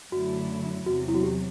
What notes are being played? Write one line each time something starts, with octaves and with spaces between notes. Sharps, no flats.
F#2 D3 F#3 A3 E4 F#4
E2 C3 F#3 F#4
E4
F#4
G4